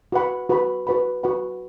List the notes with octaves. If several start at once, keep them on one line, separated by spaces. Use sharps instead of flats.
F#4 B4 F#5 B5
F#4 B4 F#5 B5
F#4 B4 F#5 B5
F#4 B4 F#5 B5